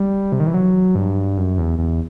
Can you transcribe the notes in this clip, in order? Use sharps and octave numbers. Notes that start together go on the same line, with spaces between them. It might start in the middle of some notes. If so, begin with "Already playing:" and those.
Already playing: G3
C3
D#3
E3
F#3
G2
F#2
E2
E2